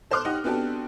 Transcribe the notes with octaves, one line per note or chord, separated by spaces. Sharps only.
A4 C5 C6 D6 F6 F#6
D#4 G4 D#5 F#5
B3 C4 D4 F#4 G4 A4